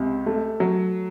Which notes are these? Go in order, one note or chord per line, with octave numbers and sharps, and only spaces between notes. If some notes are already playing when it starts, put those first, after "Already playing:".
Already playing: C#2 C3
A3
F#3